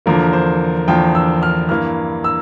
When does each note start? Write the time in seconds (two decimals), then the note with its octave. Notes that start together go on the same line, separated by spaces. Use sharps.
0.06 E2 D3 F3 A#3 A#4
0.33 C5
0.88 E2 D3 F3 A#3 G5
1.15 E6
1.43 F6
1.69 G2 E3 A#3 F6
2.24 E6